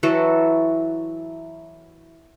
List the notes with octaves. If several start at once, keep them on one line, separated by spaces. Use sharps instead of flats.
E3 F#3 F#4 A4